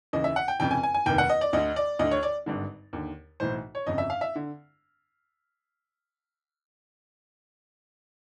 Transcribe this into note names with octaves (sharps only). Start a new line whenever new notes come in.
D#2 C#3 E3 D#5
E5
F#5
G5
F1 F2 C#3 G5
G#5
G#5
G#5
F1 D#2 D#3 G5
F#5
D#5
D5
D2 D3 D#5
D5
D2 D3 D#5
C#5
D5
G#1 G2 D3
D#2 D3
B1 A2 E3 C5
C#5
G1 F2 C#3 D#5
E5
F5
E5
D3